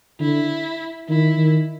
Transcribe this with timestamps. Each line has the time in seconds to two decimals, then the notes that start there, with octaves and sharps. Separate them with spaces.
0.20 D3 E4
1.09 D#3 E4
1.37 D#3